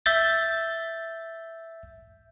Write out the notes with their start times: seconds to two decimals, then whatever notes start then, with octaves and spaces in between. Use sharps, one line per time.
0.06 E5 G6 A6